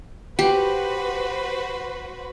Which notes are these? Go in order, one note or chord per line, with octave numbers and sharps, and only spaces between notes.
F#4 G4 B4 C5